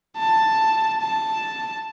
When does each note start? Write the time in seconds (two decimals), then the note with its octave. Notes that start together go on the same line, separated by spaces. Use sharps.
0.17 A5
1.01 A5